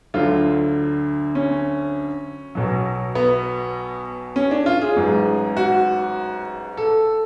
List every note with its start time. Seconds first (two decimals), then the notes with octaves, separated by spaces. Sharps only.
0.14 D2 D3 F#3 F4
1.35 C#4
2.55 B1 B2 F#3
3.15 B3
4.36 C#4
4.51 D4
4.66 F4
4.82 G#4
4.96 A1 G#2 F#3
5.57 F#4
6.77 A4